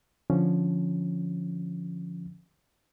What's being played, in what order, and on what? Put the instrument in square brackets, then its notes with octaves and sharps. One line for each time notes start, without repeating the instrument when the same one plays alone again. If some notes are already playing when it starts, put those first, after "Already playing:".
[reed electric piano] D3 F3 C#4